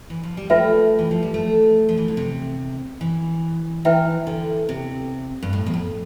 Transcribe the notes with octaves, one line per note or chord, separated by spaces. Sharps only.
E3
F3
G3
A3 F4 B4 E5 G5
E3
F3
G3
A3
F3
E3
D3
C3
E3
E3 E4 B4 E5 G5
D3
C3
G2
A2
E2
F2